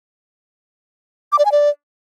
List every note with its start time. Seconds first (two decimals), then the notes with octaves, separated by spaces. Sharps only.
1.32 D6
1.39 D5
1.45 G#5
1.52 D5